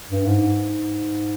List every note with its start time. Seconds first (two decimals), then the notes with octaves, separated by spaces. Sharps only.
0.10 G2
0.26 G#2